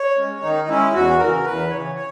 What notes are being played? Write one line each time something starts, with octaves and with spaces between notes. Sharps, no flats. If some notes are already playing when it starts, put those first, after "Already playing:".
Already playing: C#5
G#3 C#4
D#3 D#4
G#3 C#4 E4
E2 F#4
E3 A#4
C#3
E2 B4
C#3 E3 C#5
C#5